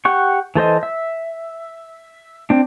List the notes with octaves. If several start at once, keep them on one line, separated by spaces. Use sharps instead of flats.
G4 F#5 C#6
E3 A4 C5 D#5
E5
C4 D4